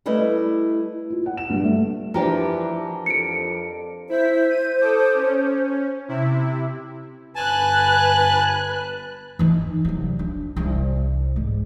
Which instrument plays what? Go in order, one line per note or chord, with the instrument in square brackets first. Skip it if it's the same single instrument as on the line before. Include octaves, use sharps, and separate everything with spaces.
[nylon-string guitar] G3 A3 E4 B4 D#5
[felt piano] F4
F#5
E7
G2
A3
[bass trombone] E3 [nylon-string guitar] F3 G4 [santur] D4 A#4
[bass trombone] F2 [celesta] C#7 D7
[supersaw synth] E4 B6 [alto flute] C5
[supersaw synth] D#7
A4 D6 D#6
C#4
C3 E4
[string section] G1 B4 F#6 [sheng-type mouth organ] G#5 A5
[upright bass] E3 D#4
C2 F#3
D4
C2
G#2